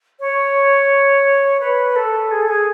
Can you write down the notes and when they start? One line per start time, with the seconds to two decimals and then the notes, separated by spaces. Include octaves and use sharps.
0.20 C#5
1.60 B4
1.96 A4
2.31 G#4
2.42 A4
2.48 G#4